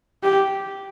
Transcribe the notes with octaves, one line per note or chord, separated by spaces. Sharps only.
G4